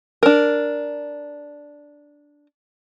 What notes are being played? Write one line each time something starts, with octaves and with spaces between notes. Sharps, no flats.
D4 A#4